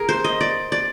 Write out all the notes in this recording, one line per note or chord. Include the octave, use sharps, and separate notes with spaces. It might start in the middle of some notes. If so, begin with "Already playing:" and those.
Already playing: G#4 A#4
C5
D#5
D5
D5